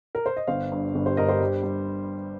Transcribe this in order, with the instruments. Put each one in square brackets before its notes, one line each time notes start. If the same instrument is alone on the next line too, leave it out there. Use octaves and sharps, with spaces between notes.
[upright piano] A#4
C5
D#5
G1 C5 F5
G2
G1
G4 C5
G2 A#4 D#5
G4 C5
G3
G3